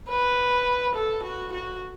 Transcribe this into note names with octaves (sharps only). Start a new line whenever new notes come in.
B4
A4
F#4
F#4